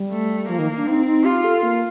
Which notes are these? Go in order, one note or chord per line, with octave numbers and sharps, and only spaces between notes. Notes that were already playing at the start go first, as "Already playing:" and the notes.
Already playing: G3
A3
F3 A#3
D#3
D4
C4 D#4
D#4
F4 G4
A4
A#3